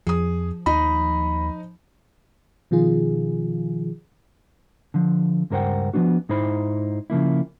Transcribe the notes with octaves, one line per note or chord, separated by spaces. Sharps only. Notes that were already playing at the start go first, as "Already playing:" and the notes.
F2 F3 G#4 D#6
D#2 D#4 D#5 B5
B2 D#3 F3 F4 G#4
D3 F3
C#2 G2 A#4 C5 F#5 G5
F3 F#3 B3 D4 F#4
G#2 D#4 E4 C5 B5
C#3 F3 A#3 E4